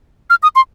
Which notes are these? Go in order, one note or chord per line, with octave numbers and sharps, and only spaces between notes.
F6
D#6
C6